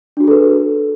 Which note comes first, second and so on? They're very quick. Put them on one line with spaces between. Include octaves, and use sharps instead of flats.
D4 F#4 G#4 A4 B4